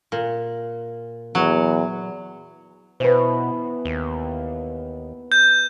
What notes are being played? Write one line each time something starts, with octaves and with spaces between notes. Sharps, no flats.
A#2
E2 F#3
B2 E3 B3 B4 C5
D#2
G6